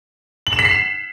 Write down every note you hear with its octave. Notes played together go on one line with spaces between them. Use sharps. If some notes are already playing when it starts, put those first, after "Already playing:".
F#7
E7
B6
C7
E7